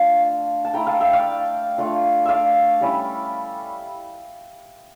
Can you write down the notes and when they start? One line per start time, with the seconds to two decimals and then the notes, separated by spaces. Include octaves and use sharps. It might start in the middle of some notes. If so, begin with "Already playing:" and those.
Already playing: A3 D4 F4 F5 A5
0.65 A5
0.74 A3 E4 G5 A#5
0.87 F5 A5
1.00 E5 G5
1.13 D5 F5
1.78 A3 D4 F4
2.26 D5 E5 F5
2.81 G3 C#4 E4